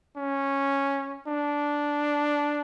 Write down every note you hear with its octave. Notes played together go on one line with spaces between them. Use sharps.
C#4
D4